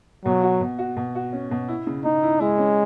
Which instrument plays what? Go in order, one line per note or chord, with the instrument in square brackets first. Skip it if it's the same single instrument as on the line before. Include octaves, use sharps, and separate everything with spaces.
[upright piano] B2 [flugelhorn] F#3
[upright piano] F#4
B2
F#4
B2
F#4
C#4
B2
E4
C#3
[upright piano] C#3 [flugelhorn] D#4
[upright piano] E4
[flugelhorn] G#3 [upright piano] E4
[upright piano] C#4